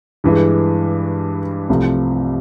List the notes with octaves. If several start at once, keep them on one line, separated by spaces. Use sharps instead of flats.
G2 E3 G#3
C2 C3 F3 A3